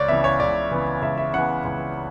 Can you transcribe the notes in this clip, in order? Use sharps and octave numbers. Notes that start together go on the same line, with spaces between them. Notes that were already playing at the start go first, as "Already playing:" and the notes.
Already playing: C#2 C#5 D5
C#3 E3 B3 E5
C#5
C#2 D5
C#3 E3 B3
C#2 E5
E5
C#3 E3 B3 F#5
C#2